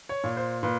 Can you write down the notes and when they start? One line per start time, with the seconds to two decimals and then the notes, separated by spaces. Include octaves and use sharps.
0.09 C#5
0.24 A#2
0.37 C5
0.63 A#2 B4